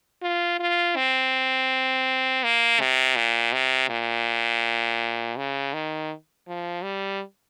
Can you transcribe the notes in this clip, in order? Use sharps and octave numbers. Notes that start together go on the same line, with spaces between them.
F4
F4
C4
A#3
C3
A#2
C3
A#2
C#3
D#3
F3
G3